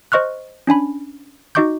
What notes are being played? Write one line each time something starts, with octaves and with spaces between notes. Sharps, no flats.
C5 D#5 C#6 F6 F#6
C#4 D4 G#5 B5
D#4 F#4 D#5 C#6 D6 G6